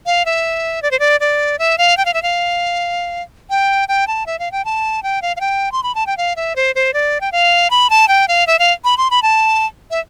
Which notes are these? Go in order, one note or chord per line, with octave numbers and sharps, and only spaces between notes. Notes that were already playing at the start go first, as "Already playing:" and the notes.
F5
E5
D5
C5
D5
D5
E5
F5
G5
F5
E5
F5
G5
G5
A5
E5
F5
G5
A5
G5
F5
F5
G5
C6
B5
A5
G5
F5
E5
C5
C5
D5
G5
F5
B5
A5
G5
F5
E5
F5
B5
C6
B5
A5
E5